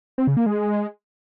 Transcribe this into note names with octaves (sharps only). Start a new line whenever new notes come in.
C4
C#3
A#3
G#3